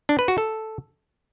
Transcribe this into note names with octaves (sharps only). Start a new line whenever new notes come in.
D4
B4
F#4
A4